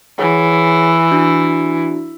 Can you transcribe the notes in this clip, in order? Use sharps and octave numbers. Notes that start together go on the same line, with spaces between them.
E3 G#4 C#5 F#5
D4 E4 F#4